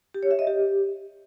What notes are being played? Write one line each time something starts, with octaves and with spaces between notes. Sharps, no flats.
G4
C#5
E5
D#5
G4